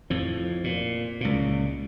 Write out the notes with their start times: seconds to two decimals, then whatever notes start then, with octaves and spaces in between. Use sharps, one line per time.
0.10 F2 A2 F3
0.64 A#2
1.21 C#2 A#2